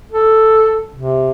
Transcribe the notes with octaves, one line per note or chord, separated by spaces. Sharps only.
A4
C3